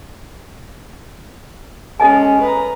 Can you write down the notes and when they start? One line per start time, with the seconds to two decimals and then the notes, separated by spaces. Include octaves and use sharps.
2.00 G#3 C#4 A4 D#5 G#5
2.41 B4 A#5